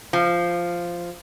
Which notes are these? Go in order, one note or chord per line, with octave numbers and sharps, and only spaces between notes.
F3